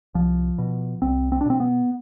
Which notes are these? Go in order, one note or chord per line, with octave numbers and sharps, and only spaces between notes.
C2 F3
B2
C2 C4
C4
D4
B2 C4
B3